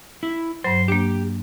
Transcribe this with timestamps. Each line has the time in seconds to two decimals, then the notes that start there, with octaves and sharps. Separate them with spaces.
0.23 E4
0.64 G2 F#3 C5
0.88 A#3 D4 G4